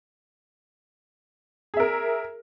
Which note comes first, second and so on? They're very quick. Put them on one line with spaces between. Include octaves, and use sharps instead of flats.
G#4 E5 A#4